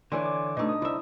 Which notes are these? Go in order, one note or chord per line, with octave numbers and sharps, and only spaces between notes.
D3 E3 E4 C#5 G#5 C6
D6
B2 A3 D4 D#4 D#5
D#6
C2 E4 E5